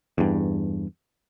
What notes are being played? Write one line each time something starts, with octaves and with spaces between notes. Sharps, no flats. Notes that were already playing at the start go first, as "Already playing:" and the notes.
E2 G2